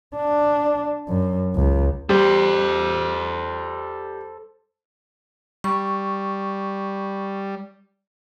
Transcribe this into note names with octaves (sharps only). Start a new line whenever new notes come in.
D4
F#2
C#2
G3 A4 C5
G3 C#6